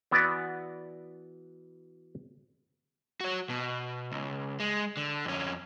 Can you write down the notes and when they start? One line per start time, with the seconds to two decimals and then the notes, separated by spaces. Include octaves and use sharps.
0.11 E3 B3 F#4 B4 D5
3.20 F#4 C#5
3.50 B2
4.12 C#2
4.60 G#3
4.97 D3
5.25 F2 C#4